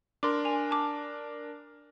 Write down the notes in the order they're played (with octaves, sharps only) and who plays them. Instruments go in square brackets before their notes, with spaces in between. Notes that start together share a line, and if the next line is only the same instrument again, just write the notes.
[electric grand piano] D4 A#4 [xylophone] C6 D6
[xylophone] G#5 F7
A5 D6